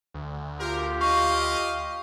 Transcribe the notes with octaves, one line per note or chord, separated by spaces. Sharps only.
D2
F4 G4 A#4
D#5 F5 C#6